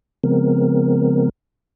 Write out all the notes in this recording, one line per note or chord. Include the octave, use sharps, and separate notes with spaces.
C#3 F3 G#3 B3 C4 A#4